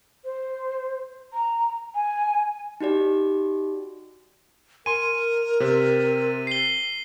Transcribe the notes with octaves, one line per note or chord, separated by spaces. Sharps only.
C5
A#5
G#5
D#4 F#4 G4 D5
A#4 G#5 C6 D#7
C3 C4
C7 G7